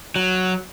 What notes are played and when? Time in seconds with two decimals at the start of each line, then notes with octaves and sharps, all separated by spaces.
0.16 F#3